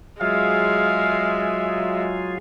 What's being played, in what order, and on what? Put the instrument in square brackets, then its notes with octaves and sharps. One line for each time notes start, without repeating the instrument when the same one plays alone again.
[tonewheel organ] F#3 F4 G#4 [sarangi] G#3 [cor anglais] E5 [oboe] F5